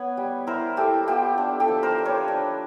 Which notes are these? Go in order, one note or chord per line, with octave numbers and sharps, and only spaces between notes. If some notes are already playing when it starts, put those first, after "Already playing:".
Already playing: B3 B4 C#5
G3
E4 A#4 C5
E4 G4 A4
B3 F4 G4
D4
G4 A4
F3
A#4 C5
D4
B4 C#5
D4